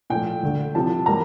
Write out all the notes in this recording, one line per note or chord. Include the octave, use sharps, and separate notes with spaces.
A#2 F3 A3 G5
D2 D3 A3
C2 C3 F3 A5
E3 G3 A#3 A#5